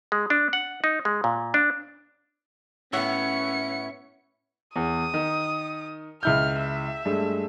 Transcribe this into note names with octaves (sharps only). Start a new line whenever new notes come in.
G#3
D4
F#5
D#4
G#3
A#2
D4
A2 B3 C#4 C#5 E5 F#5 E6 C#7
E2 D#6
D#3
C#2 E4 F6 G6
E5
G2 G#3 A3